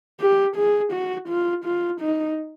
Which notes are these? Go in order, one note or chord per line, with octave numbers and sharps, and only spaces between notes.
G4
G#4
F#4
F4
F4
D#4